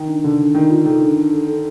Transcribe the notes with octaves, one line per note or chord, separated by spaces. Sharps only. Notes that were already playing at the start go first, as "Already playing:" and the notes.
Already playing: D#3
D4
D3 D4
D4
D#3 D4
F4
D#3 A4
D4
D4
A4
A4